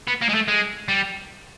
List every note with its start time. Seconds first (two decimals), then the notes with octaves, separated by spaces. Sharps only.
0.08 B3
0.22 A#3
0.29 G#3
0.35 A3
0.48 G#3
0.88 G3